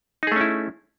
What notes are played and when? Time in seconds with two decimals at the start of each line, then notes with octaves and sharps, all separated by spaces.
0.23 D#4
0.27 G#4
0.32 A3
0.36 C#4
0.41 E4